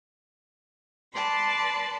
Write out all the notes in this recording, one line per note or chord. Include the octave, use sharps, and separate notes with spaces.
B4 D5 A5 C6